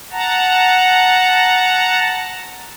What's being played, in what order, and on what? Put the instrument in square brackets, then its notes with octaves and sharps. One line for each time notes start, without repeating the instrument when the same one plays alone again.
[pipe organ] F#5 A5 A#5